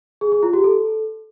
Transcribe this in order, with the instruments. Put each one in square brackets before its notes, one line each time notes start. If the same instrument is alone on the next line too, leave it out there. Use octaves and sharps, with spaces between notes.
[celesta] G#4
G#4
F4
G4
A4